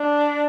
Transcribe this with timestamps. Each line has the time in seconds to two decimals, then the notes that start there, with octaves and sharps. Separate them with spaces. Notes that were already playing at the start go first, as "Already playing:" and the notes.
Already playing: D4 D5